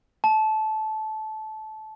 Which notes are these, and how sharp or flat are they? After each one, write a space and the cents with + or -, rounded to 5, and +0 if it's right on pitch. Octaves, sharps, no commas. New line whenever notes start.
A5 -20